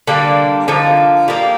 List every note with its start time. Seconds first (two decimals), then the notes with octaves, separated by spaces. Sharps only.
0.07 D3 G3 A#3 D4
0.68 D3 F3 A#3 D#4
1.28 G3 A#3 D#4